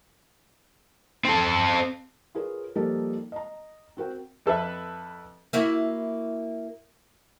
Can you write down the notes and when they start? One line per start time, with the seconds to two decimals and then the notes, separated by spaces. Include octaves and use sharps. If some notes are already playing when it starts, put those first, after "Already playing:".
1.25 C4 A4
2.35 F4 G#4 A#4 B4 C#5
2.75 F3 G3 A#3 D#4 A4 A#4
3.32 D#5 A#5
3.97 C4 F#4 A#4 G5
4.46 F2 A4 B4 E5
5.53 A#3 E4 F#4